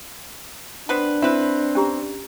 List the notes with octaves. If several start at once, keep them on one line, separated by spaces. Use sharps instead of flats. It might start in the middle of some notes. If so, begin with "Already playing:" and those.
B3 C4 D4 B4
C4 E4 B4
C#4 G4 A#5